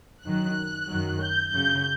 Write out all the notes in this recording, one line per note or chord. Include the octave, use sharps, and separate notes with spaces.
F#2 D#3 F#3 F#6
F#2 D#3 F#3
G6
F#2 C#3 F#3 G6